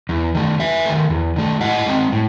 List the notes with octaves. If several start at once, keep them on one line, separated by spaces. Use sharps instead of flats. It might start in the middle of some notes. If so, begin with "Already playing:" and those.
E2
D#3 A3
E2 E5 G#5
D#3 A3
E2
D#3 A3
A2 D#5 F#5
G#3 C4
A2